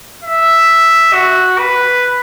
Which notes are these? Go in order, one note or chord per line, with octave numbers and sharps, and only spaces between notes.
E5
F#4
B4